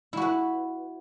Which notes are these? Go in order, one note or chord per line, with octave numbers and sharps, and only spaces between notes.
E4 F#4 B4